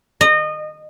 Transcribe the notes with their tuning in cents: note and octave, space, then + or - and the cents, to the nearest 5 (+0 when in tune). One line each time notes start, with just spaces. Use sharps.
D#5 -25